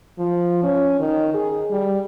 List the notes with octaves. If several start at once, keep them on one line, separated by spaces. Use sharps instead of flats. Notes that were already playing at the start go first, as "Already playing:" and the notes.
F3
C#4
D#3
G#4
G3